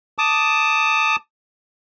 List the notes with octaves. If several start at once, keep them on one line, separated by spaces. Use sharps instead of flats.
A5 D6 D#6